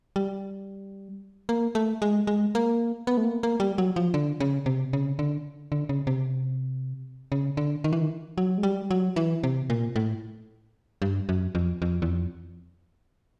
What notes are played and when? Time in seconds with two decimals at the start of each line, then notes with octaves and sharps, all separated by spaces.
0.16 G3
1.49 A#3
1.75 A3
2.02 G#3
2.27 G#3
2.55 A#3
3.07 B3
3.17 A3
3.24 A#3
3.43 A#3
3.60 G3
3.78 F#3
3.96 F3
4.14 D3
4.40 C#3
4.66 C3
4.93 C#3
5.19 D3
5.72 D3
5.89 C#3
6.07 C3
7.32 C#3
7.57 D3
7.84 D#3
7.93 E3
8.01 D#3
8.38 F#3
8.58 G#3
8.63 G3
8.91 F#3
9.16 E3
9.43 C3
9.70 A#2
9.96 A2
11.02 G2
11.29 F#2
11.55 F2
11.82 F2
12.02 E2
12.08 F2